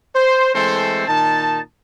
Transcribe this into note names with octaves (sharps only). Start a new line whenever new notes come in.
C5
E3 G#3 A3 C4 A4 C5
A#2 D#3 D#4 A5